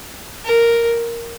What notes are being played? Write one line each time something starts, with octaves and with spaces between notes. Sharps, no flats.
A#4